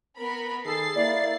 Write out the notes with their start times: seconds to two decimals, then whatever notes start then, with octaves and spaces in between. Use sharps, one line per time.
0.18 B3 A#4 B5
0.65 D#3 G#4 A4 A6 C7
0.95 A#3 E4 D5